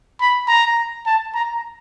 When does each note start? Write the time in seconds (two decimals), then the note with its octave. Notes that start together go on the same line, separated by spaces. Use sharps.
0.21 B5
0.48 A#5
1.06 A5
1.34 A#5